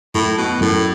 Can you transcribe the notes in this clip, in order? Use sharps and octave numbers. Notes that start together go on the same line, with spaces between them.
F#2 A2
B2
F#2 A2